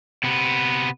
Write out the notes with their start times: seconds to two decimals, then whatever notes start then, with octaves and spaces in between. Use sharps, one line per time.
0.24 C3 B3